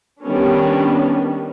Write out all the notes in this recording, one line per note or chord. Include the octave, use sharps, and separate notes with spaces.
D#3 G3 B3 C#4 D4